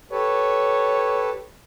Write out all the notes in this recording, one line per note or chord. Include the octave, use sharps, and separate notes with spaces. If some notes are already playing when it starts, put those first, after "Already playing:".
G4 A4 B4 C#5